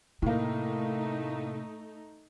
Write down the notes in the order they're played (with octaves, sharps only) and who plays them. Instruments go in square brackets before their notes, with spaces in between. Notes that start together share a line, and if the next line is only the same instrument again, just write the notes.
[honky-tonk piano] A2 A#3 [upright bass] C3 [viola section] A3 D#4